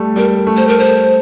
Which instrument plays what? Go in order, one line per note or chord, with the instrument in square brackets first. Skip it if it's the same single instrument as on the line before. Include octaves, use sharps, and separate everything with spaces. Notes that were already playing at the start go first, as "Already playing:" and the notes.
Already playing: [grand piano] G3 A3
[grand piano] G3 [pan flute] A#4
[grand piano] A3
[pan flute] C5
A#4
C5